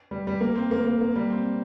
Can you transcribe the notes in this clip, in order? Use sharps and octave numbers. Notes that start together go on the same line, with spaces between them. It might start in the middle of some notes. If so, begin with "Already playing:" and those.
G3
G3
A#3
C4
A#3
A#3
A#3
G3
C4